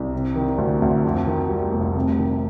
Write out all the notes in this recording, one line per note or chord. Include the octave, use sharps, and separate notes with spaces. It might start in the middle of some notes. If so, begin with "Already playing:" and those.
Already playing: C2
C3
D#3
D2
D2
F2
D#3
G3
F1
C3
D#3